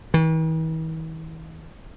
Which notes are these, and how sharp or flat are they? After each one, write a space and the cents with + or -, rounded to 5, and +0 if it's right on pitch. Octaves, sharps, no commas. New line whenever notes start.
E3 -45